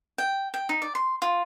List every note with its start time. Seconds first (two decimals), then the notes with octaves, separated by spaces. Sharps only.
0.18 G5
0.54 G5
0.69 D#4
0.82 D5
0.95 C6
1.22 F4